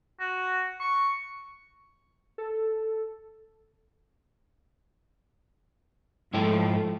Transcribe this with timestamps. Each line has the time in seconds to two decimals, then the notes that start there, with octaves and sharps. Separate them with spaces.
0.20 F#4
0.80 C#6
2.38 A4
6.34 G#2 F3 A3 E4 G5